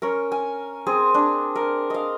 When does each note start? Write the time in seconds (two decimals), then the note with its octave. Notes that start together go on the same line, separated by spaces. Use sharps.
0.02 C#4 A#4
0.32 G#5
0.86 C4 G#4 C5
1.14 D4
1.55 A#4
1.90 D#5 F5